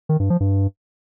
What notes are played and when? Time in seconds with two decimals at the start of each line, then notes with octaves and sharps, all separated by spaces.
0.09 D#3
0.20 G2
0.30 F3
0.40 G2